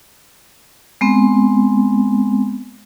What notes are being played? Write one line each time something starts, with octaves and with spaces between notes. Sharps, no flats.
G#3 B3 C4